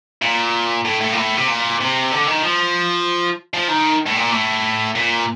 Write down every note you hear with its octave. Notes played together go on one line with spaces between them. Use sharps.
A#2
A2
A2
A#2
A2
C3
A#2
C3
D3
D#3
F3
F3
D#3
A2
A#2
A2
A#2